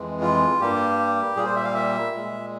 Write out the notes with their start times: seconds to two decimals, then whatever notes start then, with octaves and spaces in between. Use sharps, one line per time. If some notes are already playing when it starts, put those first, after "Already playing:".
Already playing: F2 E3 G#3
0.21 F4
0.60 G2 G3 A#3 G4
1.35 A#2 G3 A#3 G#4
1.45 C5
1.56 E5
1.64 F5
1.74 E5
2.12 A#2 G#3